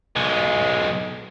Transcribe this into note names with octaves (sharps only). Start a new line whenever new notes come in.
B1 G#3